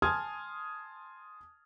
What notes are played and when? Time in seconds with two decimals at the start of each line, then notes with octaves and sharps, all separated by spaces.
0.02 G#5 A5 C6 D#6 F6 G#6